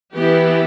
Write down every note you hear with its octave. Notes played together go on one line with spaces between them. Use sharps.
E3 B3 E4 G4